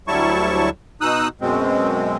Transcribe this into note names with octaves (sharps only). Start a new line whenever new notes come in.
D2 F#3 G3 E4 A5 C#6
B2 D#4 D#6 E6 F#6
F#2 B2 G#3 C4